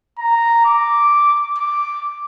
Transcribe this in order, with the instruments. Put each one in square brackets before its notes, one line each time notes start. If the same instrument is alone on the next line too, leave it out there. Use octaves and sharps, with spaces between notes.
[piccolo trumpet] A#5
D6
D6